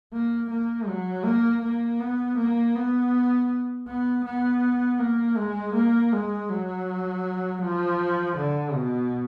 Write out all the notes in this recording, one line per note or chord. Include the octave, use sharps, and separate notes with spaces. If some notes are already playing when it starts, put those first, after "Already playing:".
A#3
A#3
F#3
A#3
A#3
B3
A#3
B3
B3
B3
A#3
G#3
A#3
G#3
F#3
F3
D3
B2